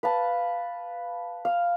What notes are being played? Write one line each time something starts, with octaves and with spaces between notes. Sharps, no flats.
B4 F5 A5
F5